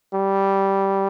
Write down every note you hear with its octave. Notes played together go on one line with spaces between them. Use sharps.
G3